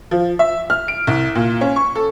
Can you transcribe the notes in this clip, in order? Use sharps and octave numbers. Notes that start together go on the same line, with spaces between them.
F3
E5
F6
D7
C2
A#2
C#4
C#6
A4